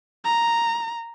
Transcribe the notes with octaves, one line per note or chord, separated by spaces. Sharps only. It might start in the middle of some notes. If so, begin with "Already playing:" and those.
A#5